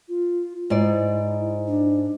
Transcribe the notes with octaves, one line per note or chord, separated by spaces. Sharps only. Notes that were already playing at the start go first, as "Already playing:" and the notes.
F4
G#2 E4 D5
D4